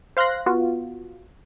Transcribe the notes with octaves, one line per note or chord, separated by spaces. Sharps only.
C5 F5 C6 F#6 A#6
B3 F4 F#4